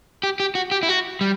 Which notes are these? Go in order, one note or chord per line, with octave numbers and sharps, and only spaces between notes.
G4
G4
F#4
G4
E4
F#4
G3